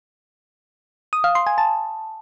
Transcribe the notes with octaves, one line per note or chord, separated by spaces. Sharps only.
D#6
F5
C6
G#5
A5